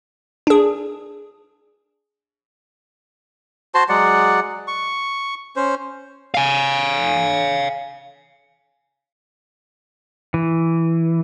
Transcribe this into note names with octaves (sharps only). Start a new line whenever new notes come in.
D4 G#4
F#4 C5 A5 C6
F#3 G#3 D5 F#5
C#6
C#4 C5
F5 G#5
E3